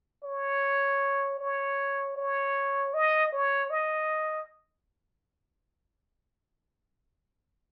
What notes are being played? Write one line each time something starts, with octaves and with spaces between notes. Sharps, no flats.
C#5
C#5
C#5
D#5
C#5
D#5